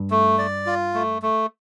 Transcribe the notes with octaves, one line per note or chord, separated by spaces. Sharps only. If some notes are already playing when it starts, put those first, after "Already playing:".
Already playing: G2
A3
D5
F4
A3
A3